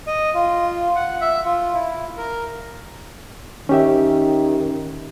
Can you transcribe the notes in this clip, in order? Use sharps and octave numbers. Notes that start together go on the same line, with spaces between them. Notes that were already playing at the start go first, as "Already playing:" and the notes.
D#5
F4
F#5
E5
F4
E4
A#4
D#3 C#4 G4 E5